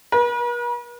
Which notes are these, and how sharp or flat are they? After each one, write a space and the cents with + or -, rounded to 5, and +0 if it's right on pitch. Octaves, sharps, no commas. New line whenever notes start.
B4 -45